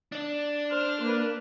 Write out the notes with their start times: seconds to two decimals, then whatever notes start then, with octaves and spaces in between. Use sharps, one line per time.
0.12 D4 D5
0.72 C5 F6
1.02 A#3 B4